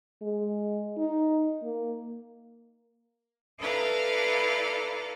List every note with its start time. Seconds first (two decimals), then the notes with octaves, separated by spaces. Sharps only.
0.22 G#3
0.97 D#4
1.63 A#3
3.58 E4 A4 B4 D5 F5 A#5